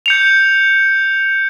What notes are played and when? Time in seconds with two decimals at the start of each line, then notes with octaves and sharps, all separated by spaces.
0.06 G6 C#7 F7